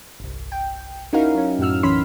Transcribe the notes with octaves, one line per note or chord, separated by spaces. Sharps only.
G1 C2
G5
C#4 D#4 E4 F#4 A#4 F5
F#3 C#4
F#2 A2 F#4 E6 F6
B1 E3 C#4 B5 C6 B6